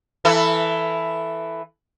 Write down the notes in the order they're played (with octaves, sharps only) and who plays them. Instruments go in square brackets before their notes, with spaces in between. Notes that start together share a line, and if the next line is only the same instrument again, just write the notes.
[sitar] E3 E4 A4